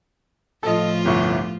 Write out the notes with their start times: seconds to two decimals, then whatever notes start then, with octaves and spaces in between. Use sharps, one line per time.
0.63 A2 F3 F4 A4 D#5
1.05 G1 C2 C#6